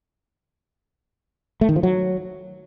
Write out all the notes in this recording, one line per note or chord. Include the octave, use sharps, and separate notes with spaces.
A3
D#3
F3
F#3